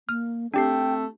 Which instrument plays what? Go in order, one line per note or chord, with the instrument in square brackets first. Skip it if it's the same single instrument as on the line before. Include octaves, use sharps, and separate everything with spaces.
[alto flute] A#3 [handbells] F6
[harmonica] A3 [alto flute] C4 [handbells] D4 G4 C7 [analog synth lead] G5